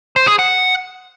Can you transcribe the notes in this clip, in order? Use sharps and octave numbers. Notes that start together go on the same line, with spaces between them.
C5
G#4
F#5